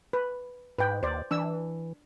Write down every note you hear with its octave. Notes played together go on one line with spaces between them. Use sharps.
B4
G#2 B4 G5
D#2 C5 D5
E3 D4 E6